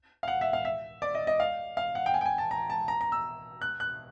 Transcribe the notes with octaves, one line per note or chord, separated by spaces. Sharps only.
F5
F#5
E5
F5
E5
D5
D#5
D#5
F5
F5
F#5
G5
G#5
G5
G#5
A5
A#5
A5
A#5
A#5
E6
F#6
F#6